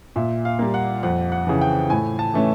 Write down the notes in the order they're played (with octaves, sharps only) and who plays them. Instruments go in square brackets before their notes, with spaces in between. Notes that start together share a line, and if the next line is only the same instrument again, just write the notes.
[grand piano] A#2 E5
F5
G3 A#3
F#5
F2 F#5
F#5
C#3 E3
G5
A2 G#5
A5
E3 A3 C#4